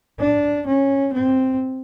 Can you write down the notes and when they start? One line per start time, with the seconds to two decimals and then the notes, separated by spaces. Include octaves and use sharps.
0.19 D4
0.66 C#4
1.13 C4